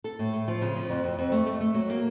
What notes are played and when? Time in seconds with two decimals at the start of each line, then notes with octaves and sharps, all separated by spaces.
0.04 A4
0.19 A2
0.33 A3
0.48 F3
0.61 C#3
0.76 F3
0.90 F2
1.04 F2
1.19 F2
1.32 A3
1.46 A3
1.61 A3
1.74 F#3
1.90 A#3